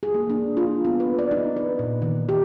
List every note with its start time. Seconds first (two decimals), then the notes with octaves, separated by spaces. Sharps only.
0.03 G#4
0.14 A#3
0.30 D4
0.57 F4
0.85 B3
1.00 B4
1.19 D5
1.31 D#4
1.57 B4
1.79 A#2
2.02 D#3
2.29 G4